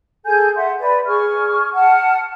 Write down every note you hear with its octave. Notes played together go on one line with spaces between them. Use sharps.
G#4 A4 G#5 G6
E5 F#5 C6
B4 D5
G#4 C#6 F6
F#5 A5 F6